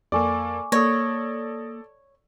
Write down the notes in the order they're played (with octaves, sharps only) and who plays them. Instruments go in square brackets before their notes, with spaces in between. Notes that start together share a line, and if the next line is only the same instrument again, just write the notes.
[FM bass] F2 [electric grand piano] A#3 A4 D5 [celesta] G#5 C#6 D6
[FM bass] A#3 [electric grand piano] A4 D5 [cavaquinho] C#5 [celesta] D#6 A#6